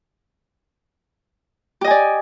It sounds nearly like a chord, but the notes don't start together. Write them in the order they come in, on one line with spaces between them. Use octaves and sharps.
G4 D#5 G#5 D5